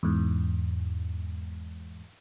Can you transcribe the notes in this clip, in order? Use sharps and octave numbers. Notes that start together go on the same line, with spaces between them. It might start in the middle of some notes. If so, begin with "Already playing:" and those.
E2 G#2